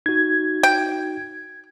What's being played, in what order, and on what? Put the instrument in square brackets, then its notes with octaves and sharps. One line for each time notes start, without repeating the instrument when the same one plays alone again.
[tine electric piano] D#4 F#4 [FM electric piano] G#6
[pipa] G5